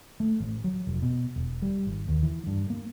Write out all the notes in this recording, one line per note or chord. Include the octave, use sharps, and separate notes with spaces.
A3
A1
F#3
F1
B2
E1
G3
G#1
D#2
E3
G2
A#3